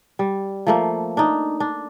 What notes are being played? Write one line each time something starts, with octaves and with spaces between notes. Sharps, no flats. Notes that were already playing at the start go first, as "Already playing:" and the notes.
G3
F3 A3 A#3
D4 D#4
D4